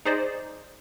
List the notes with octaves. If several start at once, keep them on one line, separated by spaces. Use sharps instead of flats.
D#4 G#4 C5 D5 D#5